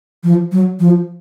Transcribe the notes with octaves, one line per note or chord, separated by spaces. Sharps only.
F3
F#3
F3